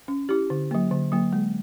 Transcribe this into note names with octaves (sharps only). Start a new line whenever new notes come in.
C#4
E4 G4
D3
F#3 A#3
D3
F#3 A#3
G#3